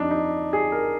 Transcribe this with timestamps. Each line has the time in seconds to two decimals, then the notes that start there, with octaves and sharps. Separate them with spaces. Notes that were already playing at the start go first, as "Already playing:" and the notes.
Already playing: F2 F3 D4 D#4
0.11 D#4
0.53 G#4
0.72 A#4